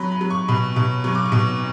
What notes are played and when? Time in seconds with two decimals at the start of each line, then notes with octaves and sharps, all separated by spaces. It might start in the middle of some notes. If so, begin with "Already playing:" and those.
Already playing: F#3 B5
0.12 B5
0.21 F#3
0.31 C#6
0.48 B2 B5
0.76 B2
1.04 F#3 C#6
1.15 D6
1.26 C#6
1.32 B2